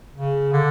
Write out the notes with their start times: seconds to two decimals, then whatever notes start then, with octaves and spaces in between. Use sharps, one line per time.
0.15 C#3
0.52 D3